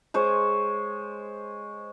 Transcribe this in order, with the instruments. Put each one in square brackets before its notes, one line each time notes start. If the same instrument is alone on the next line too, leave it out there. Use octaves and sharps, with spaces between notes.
[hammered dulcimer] G#3 C5 C#5